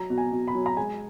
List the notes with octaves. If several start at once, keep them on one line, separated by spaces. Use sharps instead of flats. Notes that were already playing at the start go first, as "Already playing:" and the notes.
Already playing: F#3 A#5
B2
G#5
B2
B5
F#3
A#5
G#3 G#5